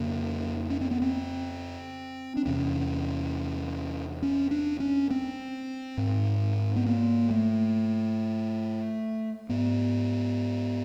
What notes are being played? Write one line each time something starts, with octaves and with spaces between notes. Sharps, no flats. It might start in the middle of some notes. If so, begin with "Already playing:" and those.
Already playing: F2 C#3 A#3
C#4
C4
B3
C4
D4
E2 C3 C#4
C#4
D4
C#4
C4
G#2
B3
A#3
A3
G#2 B3